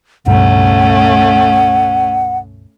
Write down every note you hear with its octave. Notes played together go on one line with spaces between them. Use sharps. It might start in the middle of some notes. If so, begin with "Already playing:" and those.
C#2 G2 B2 A3 C#4 F#5